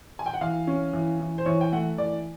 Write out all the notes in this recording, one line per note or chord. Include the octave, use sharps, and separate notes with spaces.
G#5
G5
F#5
E3 F5
C#4
E3
E3
C5
E3 C#5
G5
A3 F#5
E3 D5